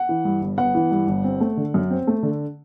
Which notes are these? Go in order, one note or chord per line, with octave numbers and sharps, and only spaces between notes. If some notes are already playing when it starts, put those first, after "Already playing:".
Already playing: F#5
E3
G2
G1
B3 F#5
E3
G2
G1
C4
A3
D3
F#2
C4
A3
D3